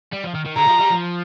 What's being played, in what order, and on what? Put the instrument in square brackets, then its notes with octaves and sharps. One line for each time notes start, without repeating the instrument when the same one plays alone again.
[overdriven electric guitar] G3
F3
D#3
D#3
[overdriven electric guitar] D3 [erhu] A#5
[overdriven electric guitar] F3
G3
F3